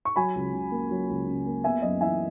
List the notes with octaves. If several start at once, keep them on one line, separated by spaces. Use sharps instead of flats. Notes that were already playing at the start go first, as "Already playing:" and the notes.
C#6
F#3 G#5 B5
C#2
C#3
A#3
F#3
C#2
C#3
A#3
B3 E5 G#5
F#2 D#5
E3 E5 G#5